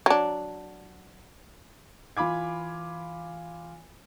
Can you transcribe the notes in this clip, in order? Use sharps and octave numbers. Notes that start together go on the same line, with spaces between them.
F#3 D4
E3 F4 B5 D6 G#6